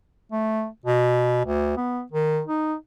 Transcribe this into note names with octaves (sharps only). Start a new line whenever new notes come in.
A3
B2
D2
B3
D#3
D#4